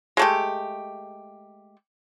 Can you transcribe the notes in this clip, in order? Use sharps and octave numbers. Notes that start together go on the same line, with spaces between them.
G#3 A3 G4